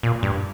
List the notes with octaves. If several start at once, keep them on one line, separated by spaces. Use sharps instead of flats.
A#2
G2